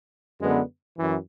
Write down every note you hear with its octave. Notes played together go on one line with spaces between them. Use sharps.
F#2 D3 G#3 B3
F#2 E3